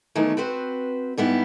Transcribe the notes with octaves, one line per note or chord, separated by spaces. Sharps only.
D#3 E3 F#3 A3 B3
C4 F#4 B4 C5
G#2 G3 B3 E4